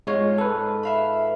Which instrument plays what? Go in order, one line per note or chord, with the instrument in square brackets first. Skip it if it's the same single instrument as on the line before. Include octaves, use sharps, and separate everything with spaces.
[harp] G#2 F4 [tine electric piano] G#3 C#5
[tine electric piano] A4 B4
[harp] E5 F5 B5